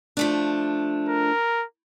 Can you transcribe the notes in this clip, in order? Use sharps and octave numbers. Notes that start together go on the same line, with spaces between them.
F3 A3 D4
A#4